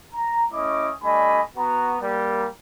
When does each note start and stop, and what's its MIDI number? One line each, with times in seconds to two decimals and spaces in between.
0.14 0.45 82
0.52 0.90 57
0.52 0.90 61
0.52 0.90 64
0.52 0.90 75
0.52 0.90 86
0.52 0.90 87
1.03 1.41 55
1.03 1.41 57
1.03 1.41 62
1.03 1.41 75
1.03 1.41 80
1.03 1.41 83
1.57 1.96 59
1.57 1.96 66
1.57 1.96 82
2.01 2.46 55
2.01 2.46 58
2.01 2.46 70